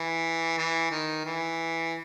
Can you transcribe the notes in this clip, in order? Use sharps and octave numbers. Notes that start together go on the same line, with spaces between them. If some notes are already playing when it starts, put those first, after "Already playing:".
Already playing: E3
E3
D#3
E3